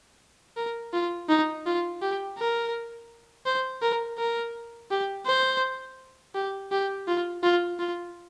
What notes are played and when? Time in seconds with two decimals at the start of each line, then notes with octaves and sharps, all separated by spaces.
0.57 A#4
0.93 F4
1.29 D#4
1.66 F4
2.02 G4
2.38 A#4
3.46 C5
3.82 A#4
4.18 A#4
4.91 G4
5.26 C5
6.35 G4
6.72 G4
7.08 F4
7.43 F4
7.79 F4